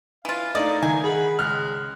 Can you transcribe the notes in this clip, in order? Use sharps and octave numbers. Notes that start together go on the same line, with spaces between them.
E3 F4 F5
A3 D#4 E4 A#4 D5 D#5 F5
D#3 G#5
G#4 F#5 B5
C#2 G#3 F6 F#6